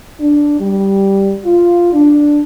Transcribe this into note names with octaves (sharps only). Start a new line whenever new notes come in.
D4
G3
F4
D4